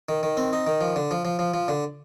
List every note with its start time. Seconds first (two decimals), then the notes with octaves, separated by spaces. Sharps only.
0.09 D#3
0.23 D#3
0.37 C4
0.53 D#4
0.67 D#3
0.81 F3
0.96 D3
1.11 F3
1.25 F3
1.39 F3
1.54 F3
1.68 D3